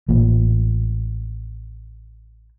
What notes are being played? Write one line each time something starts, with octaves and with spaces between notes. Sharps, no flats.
A1 A#2